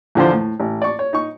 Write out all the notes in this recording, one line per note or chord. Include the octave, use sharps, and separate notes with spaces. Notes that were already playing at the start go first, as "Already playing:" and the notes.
E2 D3 F3 C5
A2
A1
D5 C#6
C#5
D#4 C#6